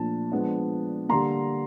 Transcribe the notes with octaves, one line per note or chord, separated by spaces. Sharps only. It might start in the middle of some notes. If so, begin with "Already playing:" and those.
Already playing: A#2 F3 A3 D4 A5
F3 G#3 B3 D4
D3 G3 A#3 A#5 C6